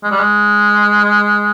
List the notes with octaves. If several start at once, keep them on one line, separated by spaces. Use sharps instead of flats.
G#3
G3
G#3